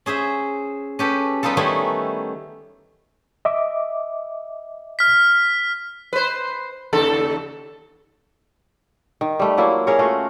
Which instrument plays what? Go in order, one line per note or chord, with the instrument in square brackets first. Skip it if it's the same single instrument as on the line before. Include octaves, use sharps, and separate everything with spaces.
[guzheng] C#4 G#4 C5 E5
C#4 G4 A4 B4
G3 B3 D#4 F4 A4
D#3 G3 A3 B3 C#4 E4
[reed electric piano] D#5 E5 D6
[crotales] F6 B6
[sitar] B4 C5
D#2 C#3 A4
[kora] D#3
G3 A3
F#3 A#3 E4 F4
C#4 G#4 A#4 C#5
A3 F4 F#4